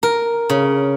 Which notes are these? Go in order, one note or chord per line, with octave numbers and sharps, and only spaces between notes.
A#4
C#3